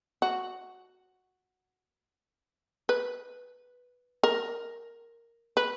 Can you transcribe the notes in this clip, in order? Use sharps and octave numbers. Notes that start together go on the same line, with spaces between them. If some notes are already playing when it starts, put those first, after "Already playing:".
F#4
B4
A#4
B4